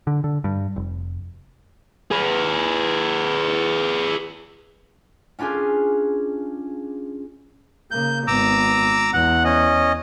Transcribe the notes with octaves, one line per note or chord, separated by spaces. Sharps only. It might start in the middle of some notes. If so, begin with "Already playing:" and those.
D3
D3
G2
F1
G#4 B4
C#4 D4 F4 G4 G#4
C#3 A#3 G6
G#1 B3 A#5 D6 E6
E2 F#5
C#4 D#5